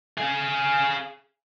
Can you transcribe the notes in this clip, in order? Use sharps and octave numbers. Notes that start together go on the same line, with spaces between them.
G#4 F5